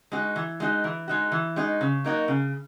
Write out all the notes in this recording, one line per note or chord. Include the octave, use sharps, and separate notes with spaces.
G#3 D#4 F#4
E3
G#3 D#4 F#4
E3
G#3 D#4 F#4
E3
G#3 D#4 F#4
C#3
F#3 A#3 D#4 F#4
C#3